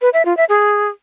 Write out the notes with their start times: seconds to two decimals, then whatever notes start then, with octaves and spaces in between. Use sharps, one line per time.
0.02 B4
0.14 E5
0.25 F4
0.37 E5
0.49 G#4